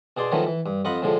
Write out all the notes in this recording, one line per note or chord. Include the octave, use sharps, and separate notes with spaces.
B2 G#4 D5 C6
D#3 F3 F#3 A3 B3 C#4
E3
G2
F2 F4 D#5 F#5 B5
A2 D3 F3 G#3